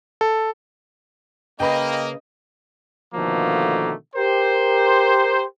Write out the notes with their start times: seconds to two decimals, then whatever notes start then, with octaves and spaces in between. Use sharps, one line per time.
0.21 A4
1.60 C#3 A#3 G#4 B4 D#5 G5 B5 D#6
3.14 B2 D3 D#3 F3 A3 A#3
4.15 G4 A#4 C5